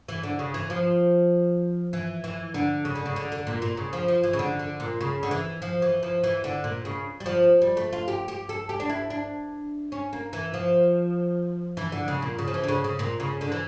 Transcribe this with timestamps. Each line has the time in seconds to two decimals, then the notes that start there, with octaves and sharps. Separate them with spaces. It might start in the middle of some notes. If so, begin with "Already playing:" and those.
0.08 E3
0.23 D3
0.39 C#3
0.54 E3
0.70 F3
1.93 E3
2.24 E3
2.54 D3
2.85 C#3
2.95 D3
3.06 C#3
3.16 D3
3.32 D3
3.47 A#2
3.62 A#2
3.77 C#3
3.93 F3
4.08 F3
4.23 E3
4.33 C#3
4.39 D3
4.59 D3
4.80 A#2
5.01 C#3
5.23 D3
5.31 E3
5.62 F3
5.82 E3
6.03 F3
6.24 E3
6.44 D3
6.64 A#2
6.85 C#3
7.20 G3
7.26 F3
7.62 G3
7.77 A3
7.92 F4
8.08 G4
8.28 G4
8.49 A4
8.69 G4
8.80 D4
8.89 E4
9.10 D4
9.92 C#4
10.13 A#3
10.33 E3
10.54 F3
11.77 E3
11.92 D3
12.08 C#3
12.22 A#2
12.38 C#3
12.48 F3
12.54 E3
12.63 D3
12.68 C#3
12.84 C#3
12.99 A#2
13.20 C#3
13.41 D3
13.52 E3